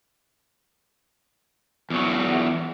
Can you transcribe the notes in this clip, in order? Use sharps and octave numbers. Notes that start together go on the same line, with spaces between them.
E2 F#3